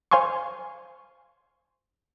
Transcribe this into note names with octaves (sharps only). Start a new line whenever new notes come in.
C5 F5 G#5 C6 C#6